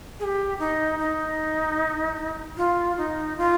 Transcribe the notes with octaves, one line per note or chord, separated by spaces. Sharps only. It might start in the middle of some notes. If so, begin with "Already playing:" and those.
G#4
G4
D#4
D#4
F4
D#4
F4